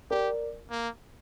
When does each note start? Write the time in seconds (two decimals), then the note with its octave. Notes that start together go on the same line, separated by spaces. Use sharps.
0.11 G4 A#4 D5
0.71 A#3